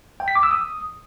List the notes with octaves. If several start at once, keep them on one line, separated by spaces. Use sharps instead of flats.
G5
B6
D6
E6
D#6